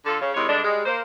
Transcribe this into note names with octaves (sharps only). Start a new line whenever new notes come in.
D3 F4 A4
C#3
C3 D#3 G#3 E4 C#5
G2 D3 G#3 D4
G3 G#3
A#3 C5